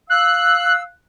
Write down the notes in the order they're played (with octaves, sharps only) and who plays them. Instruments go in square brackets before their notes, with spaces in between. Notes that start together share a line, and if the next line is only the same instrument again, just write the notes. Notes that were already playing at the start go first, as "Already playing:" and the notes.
[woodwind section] F5 E6 [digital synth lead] F#6